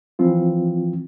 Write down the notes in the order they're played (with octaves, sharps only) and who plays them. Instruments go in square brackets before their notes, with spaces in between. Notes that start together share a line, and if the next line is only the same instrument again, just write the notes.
[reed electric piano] E3 F3 C4 F4